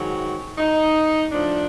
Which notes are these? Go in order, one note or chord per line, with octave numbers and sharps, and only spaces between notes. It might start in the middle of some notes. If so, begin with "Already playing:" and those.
Already playing: G#2 D#3 F#3
D#4
A2 F3 D4